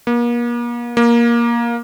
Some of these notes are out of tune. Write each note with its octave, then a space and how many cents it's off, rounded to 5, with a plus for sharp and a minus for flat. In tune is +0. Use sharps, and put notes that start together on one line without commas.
A#3 +40
A#3 +15